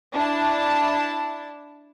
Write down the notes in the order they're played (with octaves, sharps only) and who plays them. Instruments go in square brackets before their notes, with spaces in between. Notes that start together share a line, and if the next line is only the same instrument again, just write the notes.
[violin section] D4 E4 A5